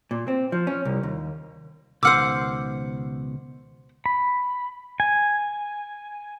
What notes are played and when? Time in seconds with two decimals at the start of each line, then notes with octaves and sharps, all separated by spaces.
0.11 A#2
0.28 C4
0.52 F3
0.67 C#4
0.85 C2
1.03 D#2
2.03 C#2 B2 D#3 C5 F#5 D6 E6 F6
4.06 B5
5.00 G#5